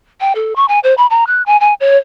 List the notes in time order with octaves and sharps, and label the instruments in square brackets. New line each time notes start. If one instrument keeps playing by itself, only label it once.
[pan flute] G5
A4
C#6
G#5
C5
B5
A#5
F#6
G#5
G#5
C#5